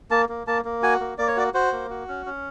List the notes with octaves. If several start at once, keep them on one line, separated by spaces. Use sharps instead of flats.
A#3 A5
A#3
A#3 A5
A#3
F#4 G#5
A#3
A#3 D5
C#5
F#4 D5
F#4 C5
A#3
F#4
C#4
C#4